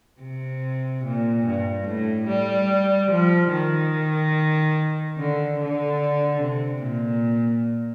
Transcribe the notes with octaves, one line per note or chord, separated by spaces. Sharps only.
C3
A#2
G2
A2
G3
F3
D#3
D3
D3
C3
A#2